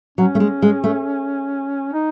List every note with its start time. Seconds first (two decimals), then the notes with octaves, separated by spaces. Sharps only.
0.18 F#3 C#4
0.35 A3
0.40 G#3
0.62 G#3
0.84 A3
1.93 D#4